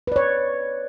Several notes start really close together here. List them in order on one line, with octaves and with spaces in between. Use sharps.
B4 D5 C#5